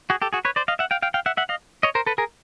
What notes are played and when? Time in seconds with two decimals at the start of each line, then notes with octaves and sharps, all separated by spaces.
0.10 F#4 G#4
0.22 G4 A4
0.33 F#4 G#4
0.45 B4 C#5
0.56 C5 D5
0.68 D#5 F5
0.79 E5 F#5
0.91 F5 G5
1.02 F5 G5
1.14 F5 G5
1.26 E5 F#5
1.37 E5 F#5
1.49 D#5 F5
1.83 C#5 D#5
1.95 A#4 C5
2.06 A4 B4
2.18 G#4 A#4